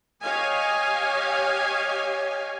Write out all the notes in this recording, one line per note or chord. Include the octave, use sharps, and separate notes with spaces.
G4 C#5 D#5 F5 G#5